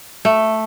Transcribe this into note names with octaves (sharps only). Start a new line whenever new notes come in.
A3